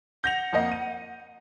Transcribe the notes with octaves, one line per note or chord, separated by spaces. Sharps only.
F#5 G6 A#6 F7
F2 A#3 D#5
D#7